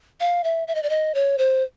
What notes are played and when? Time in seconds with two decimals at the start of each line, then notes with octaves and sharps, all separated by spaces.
0.20 F5
0.44 E5
0.68 E5
0.75 D#5
0.83 D5
0.90 D#5
1.15 C#5
1.38 C5